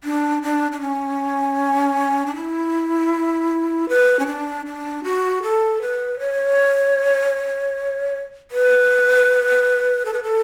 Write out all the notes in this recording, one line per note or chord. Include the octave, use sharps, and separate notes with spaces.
D4
D4
D4
C#4
D4
E4
B4
C#4
D4
D4
F#4
A4
B4
C#5
B4
A4
B4
A4